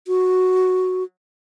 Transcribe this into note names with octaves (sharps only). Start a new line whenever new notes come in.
F#4